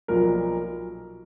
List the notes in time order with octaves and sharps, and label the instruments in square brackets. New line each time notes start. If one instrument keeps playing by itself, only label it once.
[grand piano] B1 A#2 F3 A#4